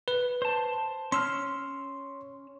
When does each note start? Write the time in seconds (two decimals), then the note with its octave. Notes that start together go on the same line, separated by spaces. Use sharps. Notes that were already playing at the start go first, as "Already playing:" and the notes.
0.08 B4
0.42 C5 A5
1.12 C#4 C6 E6 F6